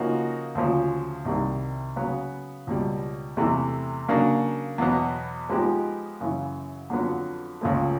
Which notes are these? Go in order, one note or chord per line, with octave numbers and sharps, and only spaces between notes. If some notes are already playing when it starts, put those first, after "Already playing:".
Already playing: C#3 F3 A#3 D#4 F#4
D2 C#3 F3
C2 C3 D#3 G3
C#3 F#3 B3
C#2 B2 G3
E2 C3 E3 A3
C#3 F#3 A#3 D4
E2 B2 F#3 B3
F3 G#3 B3 D#4 G4
F#2 C#3 E3
F2 D3 F#3 B3
C#2 C#3 F3 A3